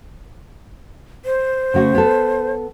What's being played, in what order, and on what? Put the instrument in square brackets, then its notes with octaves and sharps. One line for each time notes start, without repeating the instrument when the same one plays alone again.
[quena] C5
[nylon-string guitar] C#3 A3 F#4
B3 A4